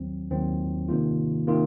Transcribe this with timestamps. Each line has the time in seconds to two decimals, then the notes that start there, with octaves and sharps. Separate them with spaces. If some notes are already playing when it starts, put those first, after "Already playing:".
Already playing: D#2 D#3 F#3 C4
0.31 D#2 D#3 F#3 C4
0.89 C3 D#3 A#3 F4
1.47 C3 D#3 A#3 F4